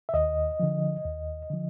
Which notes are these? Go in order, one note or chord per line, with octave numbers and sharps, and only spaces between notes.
E5
D#2 D#5
D3 F3
D#2
D3 F3